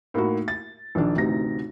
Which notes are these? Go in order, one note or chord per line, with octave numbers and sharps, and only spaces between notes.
A2 A#3 D#4 E4 F#4
A6
A#1 D#3 D4
A1 D2 C3 D#4 A#6